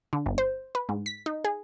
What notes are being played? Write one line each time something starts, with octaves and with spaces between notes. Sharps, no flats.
D3
G1
C5
B4
G#2
B6
D#4
G#4